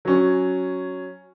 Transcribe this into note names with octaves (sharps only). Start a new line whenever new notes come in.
F#3 C#4